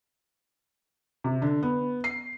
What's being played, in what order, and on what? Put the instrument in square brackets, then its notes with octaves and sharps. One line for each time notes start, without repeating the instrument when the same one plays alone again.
[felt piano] C3
D3
B3
C7